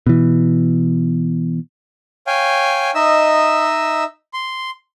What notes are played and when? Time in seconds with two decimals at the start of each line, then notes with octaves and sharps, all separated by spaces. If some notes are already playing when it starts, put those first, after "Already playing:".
0.07 B2 E3
2.27 C#5 F5 G5 G#5
2.95 D#4 D#5 E5 E6
4.33 C6